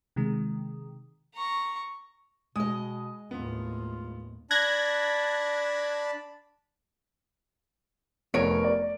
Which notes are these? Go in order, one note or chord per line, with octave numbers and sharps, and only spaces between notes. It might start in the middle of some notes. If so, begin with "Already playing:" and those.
C3 D#3 G#3
A#5 C#6
B2 G#3 D#5 D#6
D#2 A2 B3 F4
D4 A5 B5 F#6 G#6 A#6
F1 B3 A#4 C#5 D7
D5